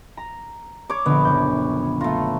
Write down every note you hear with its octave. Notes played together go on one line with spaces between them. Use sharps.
A#5
C#5 D6
A#1 D3 B3
F#1 G6
A3 F4 A#5